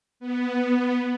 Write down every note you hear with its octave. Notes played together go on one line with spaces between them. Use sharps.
B3